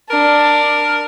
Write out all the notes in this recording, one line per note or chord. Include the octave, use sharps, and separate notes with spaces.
D4 A#4